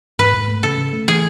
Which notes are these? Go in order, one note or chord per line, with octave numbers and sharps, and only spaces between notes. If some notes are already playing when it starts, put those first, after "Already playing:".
G#2 B4
G#2
A3
C#3 A4
C#3
A3
E3 G#4